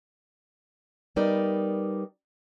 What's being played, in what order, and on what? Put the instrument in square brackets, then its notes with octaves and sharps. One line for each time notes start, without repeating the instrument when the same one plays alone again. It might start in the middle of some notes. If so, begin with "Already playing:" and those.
[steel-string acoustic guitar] G3 B3 D#4 A#4 D5